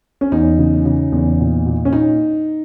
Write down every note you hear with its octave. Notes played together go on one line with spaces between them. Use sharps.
C#4
E2 D#4
C#3
C#3
E2
A#2
A#2
C#4
A#2 D#4